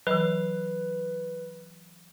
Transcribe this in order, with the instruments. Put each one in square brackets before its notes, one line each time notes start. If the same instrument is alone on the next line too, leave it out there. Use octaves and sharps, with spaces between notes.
[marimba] E3 F#3 [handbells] B4